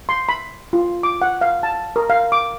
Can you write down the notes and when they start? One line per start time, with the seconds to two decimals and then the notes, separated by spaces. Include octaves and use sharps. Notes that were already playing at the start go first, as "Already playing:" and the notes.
0.09 C6
0.29 B5
0.73 F4
1.03 D6
1.22 F#5
1.41 F5
1.63 A5
1.96 A#4
2.10 F5
2.32 D6